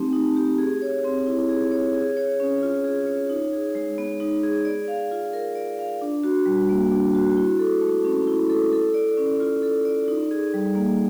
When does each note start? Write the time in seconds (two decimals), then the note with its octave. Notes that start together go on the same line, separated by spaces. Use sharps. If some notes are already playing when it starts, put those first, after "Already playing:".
Already playing: A3 C4 D#4 G4
0.13 D#4
0.36 G4
0.58 G#4
0.82 C#5
1.04 C4
1.27 E4
1.49 G#4
1.72 C#5
1.94 G#4
2.17 C#5
2.40 C#4
2.63 F4
2.84 G#4
3.07 C#5
3.29 D#4
3.53 G#4
3.75 G#3
3.98 B3
4.20 D#4
4.43 G#4
4.65 D5
4.88 F5
5.11 F4
5.33 A#4
5.55 D5
5.79 F5
6.02 D4
6.24 F#4
6.46 G3
6.69 A#3
6.92 D4
7.15 F#4
7.37 E4
7.59 A4
7.82 A3
8.04 C#4
8.27 E4
8.50 A4
8.73 A4
8.94 D5
9.17 C#4
9.40 F4
9.63 A4
9.85 D5
10.08 D#4
10.31 G#4
10.54 G3
10.75 A#3